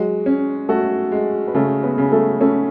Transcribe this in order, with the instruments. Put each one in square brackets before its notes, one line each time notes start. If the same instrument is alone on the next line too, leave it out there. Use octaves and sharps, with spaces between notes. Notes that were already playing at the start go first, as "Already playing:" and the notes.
Already playing: [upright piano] F#3 F#4 [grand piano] G#3
[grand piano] C#4
[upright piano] A3 A4 [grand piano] F#4
[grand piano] G#3
[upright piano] B4
[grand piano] C#3 [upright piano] A3 A4
[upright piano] B3 B4
[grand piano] C#3
[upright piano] A3 A4
[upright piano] A3 A4 [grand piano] C#4